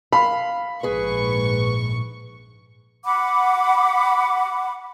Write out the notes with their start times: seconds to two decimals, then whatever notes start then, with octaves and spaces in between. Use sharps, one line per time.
0.13 F5 B5
0.83 A#1 G#2 G#4 B4 C#6
3.05 F#5 B5 D6